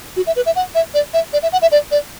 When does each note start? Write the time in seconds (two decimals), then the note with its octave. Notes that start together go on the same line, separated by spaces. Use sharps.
0.17 F#4
0.27 E5
0.36 B4
0.46 E5
0.56 F#5
0.75 E5
0.94 D5
1.14 E5
1.33 D5
1.43 E5
1.53 F#5
1.62 E5
1.72 D5
1.91 D5